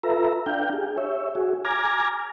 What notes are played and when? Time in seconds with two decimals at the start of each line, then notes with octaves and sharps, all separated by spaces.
0.03 F4 A4 B4 E5 A#5
0.46 D4 F5 G5 G6
0.73 G4 G#4
0.98 C#5 E5
1.35 F#4 G#4
1.65 G#5 A#5 D6 F6 G#6 A#6